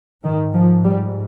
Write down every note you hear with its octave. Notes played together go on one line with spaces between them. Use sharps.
G#2 D#3
F3
G3